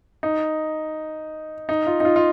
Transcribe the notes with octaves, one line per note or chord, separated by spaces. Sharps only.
D#4
D#4
F4
D#4
F4
F4